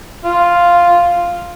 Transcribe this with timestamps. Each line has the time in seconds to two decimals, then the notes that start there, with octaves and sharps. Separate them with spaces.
0.25 F4